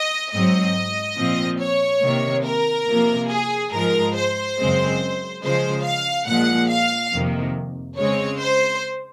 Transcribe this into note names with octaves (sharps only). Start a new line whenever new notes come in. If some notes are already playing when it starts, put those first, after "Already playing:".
Already playing: D#5
G#2 F#3 C4 D#5
A#2 F3 C4
C#5
C3 D#3 A#3
A#4
C3 F3 A#3
G#4
G#2 F3 G#3 A#4
C5
F#2 C#3 G#3 C4
C#3 F3 G#3 C5
F5
A#2 F3 G#3 F#5
F5
F2 C3 D#3 A#3
C#3 G#3 C4 C#5
C5